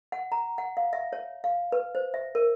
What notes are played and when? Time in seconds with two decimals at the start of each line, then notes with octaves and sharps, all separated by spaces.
0.12 F#5
0.32 A#5
0.58 F#5
0.77 F5
0.93 E5
1.13 C#5
1.44 F5
1.72 B4
1.95 C5
2.14 E5
2.35 A#4